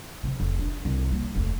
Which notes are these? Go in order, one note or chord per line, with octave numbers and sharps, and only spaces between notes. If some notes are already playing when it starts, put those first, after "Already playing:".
C3 F3
F1
D4
C2
G3 A#3
F1 D2